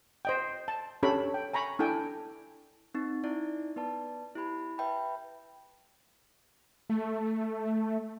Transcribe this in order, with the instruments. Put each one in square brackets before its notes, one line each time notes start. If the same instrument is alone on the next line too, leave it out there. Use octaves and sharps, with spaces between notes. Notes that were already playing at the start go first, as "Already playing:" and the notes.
[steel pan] C5 D#5 G5
A5
C#4 D4 G4 A4 C#5 B5
G5
G#5 A#5 B5 C#6
D4 E4 A4 G5 G#5
[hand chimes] C4 D#4
D#4 E4 D5
B3 B4 D5 A5
E4 G4 B5
B4 E5 G5 A5 B5
[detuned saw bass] A3